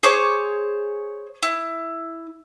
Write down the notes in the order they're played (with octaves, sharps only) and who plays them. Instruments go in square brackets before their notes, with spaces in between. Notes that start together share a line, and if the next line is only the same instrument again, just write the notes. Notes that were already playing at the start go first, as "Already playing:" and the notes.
[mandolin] G#4 C5 C#5 D6
E4